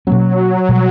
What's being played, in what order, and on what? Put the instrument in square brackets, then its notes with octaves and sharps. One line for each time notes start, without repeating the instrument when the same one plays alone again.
[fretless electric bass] B2 A#3 C#4 [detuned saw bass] F#3
[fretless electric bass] B2 G3